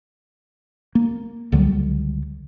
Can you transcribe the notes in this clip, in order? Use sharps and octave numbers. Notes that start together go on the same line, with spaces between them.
A#3
C#2 D3 F#3 G3